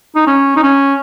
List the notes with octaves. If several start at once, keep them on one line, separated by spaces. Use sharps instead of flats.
D#4
C#4
D#4
C#4